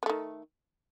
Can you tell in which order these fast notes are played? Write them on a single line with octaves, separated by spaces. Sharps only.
B3 A3 D#3